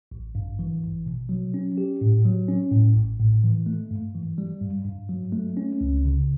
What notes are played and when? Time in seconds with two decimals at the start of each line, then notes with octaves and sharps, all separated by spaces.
0.12 A1
0.35 G2
0.59 E3
0.82 A1
1.06 B2
1.29 F#3
1.54 C#4
1.78 G4
2.01 A2
2.25 F#3
2.48 C#4
2.72 A2
2.96 A1
3.20 A2
3.44 E3
3.66 A3
3.91 G2
4.15 E3
4.38 G3
4.61 G2
4.85 G2
5.09 F#3
5.32 A3
5.57 C#4
5.81 C#2
6.05 C#3